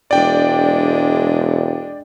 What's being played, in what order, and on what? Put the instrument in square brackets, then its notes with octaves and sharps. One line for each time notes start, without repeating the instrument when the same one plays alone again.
[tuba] E1 [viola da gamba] G#3 D4 [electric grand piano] D5 G5